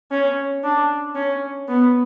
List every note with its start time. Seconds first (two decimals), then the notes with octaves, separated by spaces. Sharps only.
0.11 C#4
0.64 D4
1.15 C#4
1.68 B3